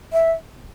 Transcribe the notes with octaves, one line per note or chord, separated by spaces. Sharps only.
E5